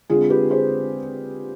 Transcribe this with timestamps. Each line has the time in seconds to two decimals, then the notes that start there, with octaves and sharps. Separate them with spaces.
0.10 D3 G#3 C4 F4 G#4
0.30 G4 B4
0.51 G#4 C5